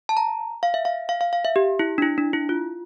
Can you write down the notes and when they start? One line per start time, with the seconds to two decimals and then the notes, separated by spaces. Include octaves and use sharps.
0.09 A5
0.17 A#5
0.63 F5
0.74 E5
0.85 F5
1.09 F5
1.21 F5
1.33 F5
1.45 E5
1.56 G4
1.79 E4
1.98 D4
2.02 E4
2.18 D4
2.33 E4
2.49 F4